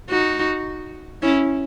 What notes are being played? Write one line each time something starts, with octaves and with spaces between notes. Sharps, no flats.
D#4 F#4
C#4 E4